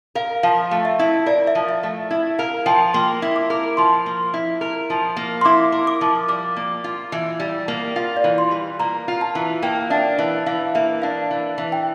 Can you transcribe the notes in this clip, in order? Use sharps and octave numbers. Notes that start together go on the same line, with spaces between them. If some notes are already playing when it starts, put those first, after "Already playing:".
A#4 F5
F3 F5
A3
E5
E4
A#4 D5
E5
F3
E5
A3
E4
A#4 F5
F3 G5
A#3 C6
E4
D6
A#4
F3 C6
A#3
E4
A#4
F3
A#3
C6
E4 D6
A#4
D6
F3
G3 D6
A#3
F4
E3
G3
A#3
F4 F5
D5
E3
C6
G3
A#3 A#5
F4
A5
E3
A#3 G5
D4 E5
E3 E5
E3 F5
A#3 E5
D4 F5
E3
E3
G5